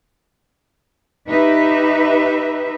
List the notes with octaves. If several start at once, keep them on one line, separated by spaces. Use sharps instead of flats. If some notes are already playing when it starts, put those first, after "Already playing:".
D#4 G4 B4 E5